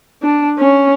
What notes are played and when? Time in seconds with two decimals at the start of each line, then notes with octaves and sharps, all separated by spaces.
0.23 D4
0.59 C#4